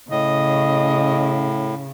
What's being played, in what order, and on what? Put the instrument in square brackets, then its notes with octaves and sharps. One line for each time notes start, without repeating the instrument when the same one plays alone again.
[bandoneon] A2 [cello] C#3 [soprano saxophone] D#5